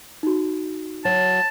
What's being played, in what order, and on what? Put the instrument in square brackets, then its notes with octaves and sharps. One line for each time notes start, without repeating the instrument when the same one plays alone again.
[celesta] D#4 F#4
[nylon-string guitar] F#3 [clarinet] A5